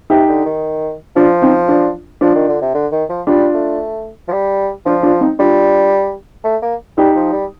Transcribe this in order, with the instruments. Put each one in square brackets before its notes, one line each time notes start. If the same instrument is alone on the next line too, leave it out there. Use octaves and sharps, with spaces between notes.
[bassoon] C3 [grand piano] D#4 G4
[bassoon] D3
D#3
[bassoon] F3 [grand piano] D4 F4
[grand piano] C4 D#4
D4 F4
[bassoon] F3 [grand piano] D4 F4
[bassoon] D#3
D3
C3
D3
D#3
F3
[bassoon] G3 [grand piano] D4 F4
[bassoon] A3
F3
G3
[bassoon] F3 [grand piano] D4 F4
[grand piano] D4 F4
C4 D#4
[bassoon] G3 [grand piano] D4 F4
[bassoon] A3
A#3
[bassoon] G3 [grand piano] D#4 G4
[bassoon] F3
G3